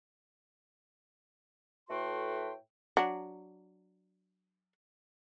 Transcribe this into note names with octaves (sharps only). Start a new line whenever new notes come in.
A2 A3 F#4 B4 G5 C6
F#3 D4